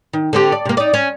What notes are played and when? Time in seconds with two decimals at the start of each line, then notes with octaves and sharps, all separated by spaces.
0.13 D#3
0.33 D3 C4 G4
0.52 D5
0.65 C3 A#3
0.77 D#4 D5
0.94 C#4